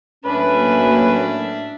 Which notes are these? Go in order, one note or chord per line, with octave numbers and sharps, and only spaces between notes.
A2 F#3 A#3 C#4 D4 B4 E5